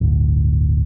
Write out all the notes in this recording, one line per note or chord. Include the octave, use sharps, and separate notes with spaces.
D1 G1 D2